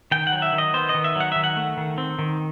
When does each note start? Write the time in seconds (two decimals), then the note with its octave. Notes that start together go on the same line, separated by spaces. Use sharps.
0.12 D#3 G5
0.27 F#5
0.32 F#3
0.42 E5
0.53 D#3
0.58 D#5
0.74 B3 C5
0.89 D#5
0.94 D#3
1.04 E5
1.16 F#3 F#5
1.32 D#3 E5
1.44 F#5
1.57 A3
1.77 D#3
1.98 C4
2.19 D#3